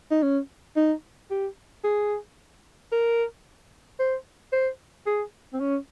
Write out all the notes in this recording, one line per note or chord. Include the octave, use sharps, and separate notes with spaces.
D#4
C#4
D#4
G4
G#4
A#4
C5
C5
G#4
C4
C#4